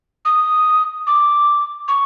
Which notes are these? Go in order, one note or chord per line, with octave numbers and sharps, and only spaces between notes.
D#6
D6
C#6